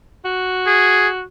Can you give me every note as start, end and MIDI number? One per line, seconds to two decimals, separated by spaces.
0.25 1.23 66
0.67 1.08 68